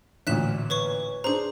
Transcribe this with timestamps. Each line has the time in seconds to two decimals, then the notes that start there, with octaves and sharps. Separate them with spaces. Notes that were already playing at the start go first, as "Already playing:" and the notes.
0.27 A1 D2 A#2 F#6 B6 E7
0.70 B4 C#5 C#6
1.24 D4 G#4 C5 A#5